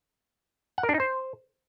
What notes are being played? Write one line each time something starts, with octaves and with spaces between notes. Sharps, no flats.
F#5
A#4
D4
D#4
C5